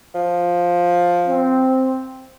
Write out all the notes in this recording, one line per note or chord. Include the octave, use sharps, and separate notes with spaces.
F3
C4